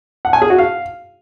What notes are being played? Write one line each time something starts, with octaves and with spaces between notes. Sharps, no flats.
F#5
G#5
G#4
F#4
F5